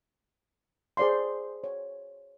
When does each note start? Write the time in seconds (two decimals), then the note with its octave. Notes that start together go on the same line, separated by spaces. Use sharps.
0.97 G#4 C5 D5 F5 C6
1.64 C#5